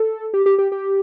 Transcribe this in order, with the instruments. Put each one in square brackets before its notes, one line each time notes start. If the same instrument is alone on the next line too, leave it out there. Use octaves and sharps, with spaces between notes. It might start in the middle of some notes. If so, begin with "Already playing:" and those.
Already playing: [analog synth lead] A4
G4
G4
G4
G4